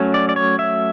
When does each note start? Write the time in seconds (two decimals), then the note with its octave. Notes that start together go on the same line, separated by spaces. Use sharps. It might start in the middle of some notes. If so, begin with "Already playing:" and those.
Already playing: F#3 A3 C#4
0.14 D5
0.29 D5
0.36 C#5
0.59 E5